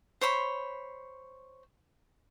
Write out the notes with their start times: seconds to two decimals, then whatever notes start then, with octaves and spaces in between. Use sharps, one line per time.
0.21 C5 C#5 B5